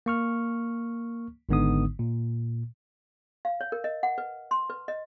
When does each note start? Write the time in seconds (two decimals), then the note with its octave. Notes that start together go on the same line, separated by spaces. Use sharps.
0.06 A#3 C#6 F6
1.49 G#1 G#2 D3 B3 D#4 D#6
1.99 A#2
3.45 F5
3.61 C#5
3.72 A#4
3.84 D#5
4.03 F#5
4.18 B4
4.51 C6
4.70 B4
4.88 D#5